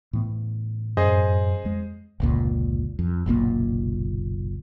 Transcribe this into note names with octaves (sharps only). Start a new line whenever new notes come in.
A2 E3 B3
F#2 G#4 C5 D#5
F2 G#3
F1 C#2 A#2
F2
F#1 B1 A#2 A#3